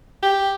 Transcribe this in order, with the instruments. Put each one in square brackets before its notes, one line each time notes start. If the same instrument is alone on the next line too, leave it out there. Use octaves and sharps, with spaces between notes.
[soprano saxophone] G4